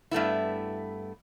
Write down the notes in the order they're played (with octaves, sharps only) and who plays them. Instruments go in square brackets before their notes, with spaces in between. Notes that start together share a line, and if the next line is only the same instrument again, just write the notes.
[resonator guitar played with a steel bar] G2 A3 B3 E4